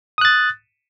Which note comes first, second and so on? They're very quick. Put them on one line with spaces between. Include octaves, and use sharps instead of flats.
D#6 F#6 A6